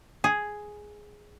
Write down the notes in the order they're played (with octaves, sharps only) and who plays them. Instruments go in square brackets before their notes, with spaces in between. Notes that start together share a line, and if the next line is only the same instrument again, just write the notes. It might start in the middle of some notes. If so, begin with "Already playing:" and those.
[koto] G#4